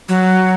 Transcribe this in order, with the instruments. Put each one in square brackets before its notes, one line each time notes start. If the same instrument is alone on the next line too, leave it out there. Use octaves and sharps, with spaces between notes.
[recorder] F#3